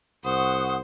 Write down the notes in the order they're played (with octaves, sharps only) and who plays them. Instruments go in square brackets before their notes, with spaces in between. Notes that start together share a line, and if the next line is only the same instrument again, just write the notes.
[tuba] C2 [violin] C5 [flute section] F#5 C#6 D#6